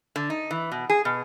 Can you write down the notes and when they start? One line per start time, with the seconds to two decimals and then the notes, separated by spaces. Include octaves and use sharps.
0.16 D3
0.30 D#4
0.51 E3
0.72 B2
0.90 G#4
1.05 B2